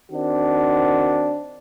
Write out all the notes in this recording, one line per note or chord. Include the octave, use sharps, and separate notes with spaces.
D#3 C4 D4 F#4